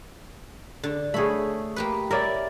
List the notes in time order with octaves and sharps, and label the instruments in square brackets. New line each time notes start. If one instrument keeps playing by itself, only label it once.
[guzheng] D3
[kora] A3 G#4 [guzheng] C#5 B5
[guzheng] A#3 G4 B4
[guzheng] E4 [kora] A#4 D5